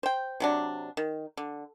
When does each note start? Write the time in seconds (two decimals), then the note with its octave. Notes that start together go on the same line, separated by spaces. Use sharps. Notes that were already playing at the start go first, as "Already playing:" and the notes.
0.03 C5 G5
0.40 C3 F#3 D4
0.97 D#3
1.37 D3